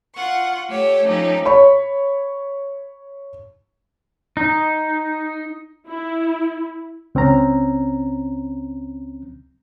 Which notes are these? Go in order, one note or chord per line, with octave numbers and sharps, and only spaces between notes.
F4 F#5 C#6
A3 G4 C#5 E6
F3 A3 C#4 D#4 G4
C#5 B5 C#6
D#4
E4
C#2 C4 C#4 A#5